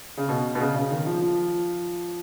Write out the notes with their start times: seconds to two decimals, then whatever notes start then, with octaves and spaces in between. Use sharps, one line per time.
0.17 C#3
0.29 B2
0.55 B2
0.60 C#3
0.75 C#3
0.91 D#3
1.06 F3
1.22 F3